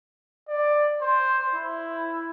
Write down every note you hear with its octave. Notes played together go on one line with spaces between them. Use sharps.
D5
C5
E4